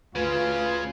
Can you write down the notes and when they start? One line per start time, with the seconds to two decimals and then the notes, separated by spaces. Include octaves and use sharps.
0.16 D2 C#3 C#4 F4 B4